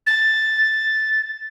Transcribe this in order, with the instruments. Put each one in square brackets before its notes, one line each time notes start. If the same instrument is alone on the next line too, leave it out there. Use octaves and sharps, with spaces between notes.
[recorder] A6